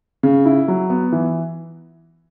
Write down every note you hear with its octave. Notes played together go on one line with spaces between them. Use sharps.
C#3
E4
F#3
B3
E3